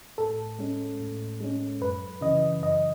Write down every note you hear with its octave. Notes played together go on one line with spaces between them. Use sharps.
A2 A4
G#3 C#4
A2
G#3 C#4
F#2 B4
C#3 E3 D#5
F#2 D#5